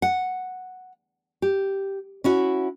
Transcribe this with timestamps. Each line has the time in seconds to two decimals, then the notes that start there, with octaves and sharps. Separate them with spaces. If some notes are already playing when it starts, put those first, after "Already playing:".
0.02 F#5
1.42 G4
2.24 C#4 E4 F#4